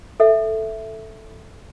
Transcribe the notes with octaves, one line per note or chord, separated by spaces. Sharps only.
A4 E5 F#5